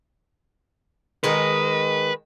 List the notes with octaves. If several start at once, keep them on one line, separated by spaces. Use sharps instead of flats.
D#3 G#3 D#4 B4